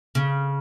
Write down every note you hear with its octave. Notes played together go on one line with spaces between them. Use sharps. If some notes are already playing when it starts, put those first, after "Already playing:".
C#3